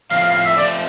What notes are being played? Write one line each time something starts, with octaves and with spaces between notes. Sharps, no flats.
A2 F3 C4 F5
F5
F5
E5
F3 A3 C4 D5